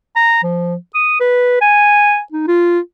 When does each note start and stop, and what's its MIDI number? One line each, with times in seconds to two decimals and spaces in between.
0.16 0.41 82
0.43 0.75 53
0.95 1.17 87
1.20 1.60 71
1.61 2.20 80
2.32 2.45 63
2.47 2.79 65